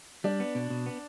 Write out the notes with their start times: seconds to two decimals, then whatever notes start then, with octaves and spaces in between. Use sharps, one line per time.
0.24 G3 D4
0.40 B3
0.55 B2
0.70 B2
0.86 B3